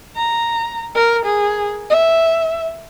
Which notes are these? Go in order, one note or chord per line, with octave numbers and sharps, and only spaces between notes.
A#5
A#4
G#4
E5